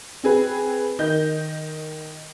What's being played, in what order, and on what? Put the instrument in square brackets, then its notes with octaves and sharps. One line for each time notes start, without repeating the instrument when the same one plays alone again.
[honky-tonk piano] C4 G#4 B4
D#3 D#5 G6